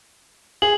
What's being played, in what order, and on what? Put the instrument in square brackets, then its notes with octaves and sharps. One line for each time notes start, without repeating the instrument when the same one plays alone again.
[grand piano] G#4 [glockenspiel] F#7